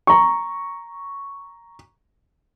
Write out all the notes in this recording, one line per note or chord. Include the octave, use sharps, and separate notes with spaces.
A#5 C#6